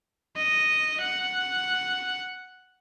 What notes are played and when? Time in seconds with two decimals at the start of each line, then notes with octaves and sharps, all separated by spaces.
0.37 D#5
1.01 F#5